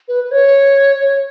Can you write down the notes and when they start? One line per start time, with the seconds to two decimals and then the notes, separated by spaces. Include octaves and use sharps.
0.08 B4
0.24 B4
0.31 C#5
0.99 C#5